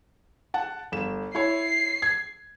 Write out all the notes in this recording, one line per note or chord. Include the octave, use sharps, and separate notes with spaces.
F#5 A5
G1 E7
E4 C#5 C7
G#6